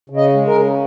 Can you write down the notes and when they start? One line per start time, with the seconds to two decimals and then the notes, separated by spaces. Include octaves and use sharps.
0.10 C#3
0.17 D#5
0.33 G#3
0.47 A#4
0.56 C#3